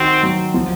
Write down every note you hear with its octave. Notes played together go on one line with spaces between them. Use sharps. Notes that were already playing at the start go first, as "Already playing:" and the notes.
Already playing: D#3 C4 F#4
F#3
F3